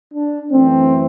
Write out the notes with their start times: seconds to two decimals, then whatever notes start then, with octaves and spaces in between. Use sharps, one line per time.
0.14 D4
0.51 F#2 E3 A3 C4